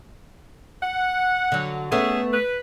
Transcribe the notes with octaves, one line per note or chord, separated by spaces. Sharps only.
F#5
D3 F#3
A3 B3 C#4 G#4 E5
B4